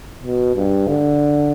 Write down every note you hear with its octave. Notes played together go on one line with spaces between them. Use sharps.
B2
G2
D3